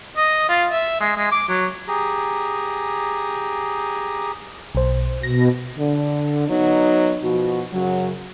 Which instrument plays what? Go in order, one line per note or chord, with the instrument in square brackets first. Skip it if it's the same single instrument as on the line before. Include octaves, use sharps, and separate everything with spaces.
[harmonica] D#5
F4
E5
G#3
G#3
D6
F#3
[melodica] G4 G#4 A#5
[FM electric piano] B1 C5
[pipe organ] B2 [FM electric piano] A#6
[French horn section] D3
F#3 B3 D#4
B2 F3 F#4
F#2 C#3 F#3